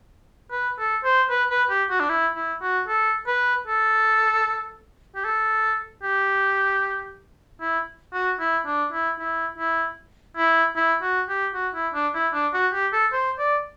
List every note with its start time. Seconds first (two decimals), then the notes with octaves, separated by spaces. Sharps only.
0.51 B4
0.78 A4
1.04 C5
1.30 B4
1.50 B4
1.70 G4
1.90 F#4
2.00 D4
2.09 E4
2.35 E4
2.61 F#4
2.88 A4
3.27 B4
3.67 A4
5.15 G4
5.24 A4
6.03 G4
7.61 E4
8.13 F#4
8.40 E4
8.66 D4
8.92 E4
9.19 E4
9.58 E4
10.37 E4
10.76 E4
11.02 F#4
11.29 G4
11.54 F#4
11.74 E4
11.94 D4
12.14 E4
12.33 D4
12.53 F#4
12.73 G4
12.93 A4
13.13 C5
13.39 D5